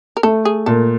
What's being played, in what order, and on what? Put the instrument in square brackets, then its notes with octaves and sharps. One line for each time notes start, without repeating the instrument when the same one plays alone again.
[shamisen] A#4
[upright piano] A3 [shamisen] A4
[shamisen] G#4
[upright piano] A#2 [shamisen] A4